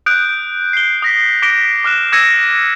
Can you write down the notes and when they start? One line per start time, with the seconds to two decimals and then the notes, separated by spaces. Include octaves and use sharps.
0.06 D#6 F#6 G6 D7
0.73 C7 G7
1.02 D#6 A#6 B6
1.42 D6 A#6 B6 D7 G7
1.84 D6 F6 F#6 E7
2.12 D6 E6 G#6 A#6 C#7 D#7